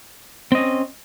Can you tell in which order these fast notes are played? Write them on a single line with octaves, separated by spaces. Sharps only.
C4 D#5 C#4